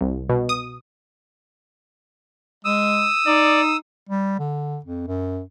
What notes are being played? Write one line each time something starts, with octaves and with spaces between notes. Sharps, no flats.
C2
B2
D#6
G#3 D#6 E6
D#4 D5
G3
D3
F2
F#2